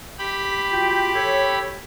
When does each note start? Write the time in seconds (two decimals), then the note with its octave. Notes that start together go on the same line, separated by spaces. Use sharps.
0.19 G4 B5
0.72 F4 F#4 G5
1.15 A4 C#5